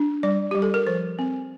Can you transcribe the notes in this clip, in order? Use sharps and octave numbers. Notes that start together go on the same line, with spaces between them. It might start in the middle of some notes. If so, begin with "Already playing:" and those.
Already playing: D4
G3 D5
G3 G4
A4
A#4
F3 C5
C4